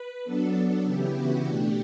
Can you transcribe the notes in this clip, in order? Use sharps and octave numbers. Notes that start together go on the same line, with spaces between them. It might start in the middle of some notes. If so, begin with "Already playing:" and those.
Already playing: B4
F#3 B3 D4 A4
C#3 E3 B3 E4 G4
F#4
B2 A3 D4 G4